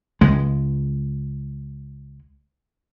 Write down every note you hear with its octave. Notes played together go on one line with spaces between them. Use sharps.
C#2 G#3